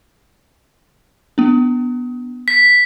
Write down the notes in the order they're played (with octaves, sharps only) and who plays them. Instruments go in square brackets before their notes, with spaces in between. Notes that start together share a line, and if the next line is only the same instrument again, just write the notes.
[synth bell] B3 D4
[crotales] B6